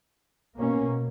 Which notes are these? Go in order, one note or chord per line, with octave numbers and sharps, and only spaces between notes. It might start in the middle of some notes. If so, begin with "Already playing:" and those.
B2 A#3 C#4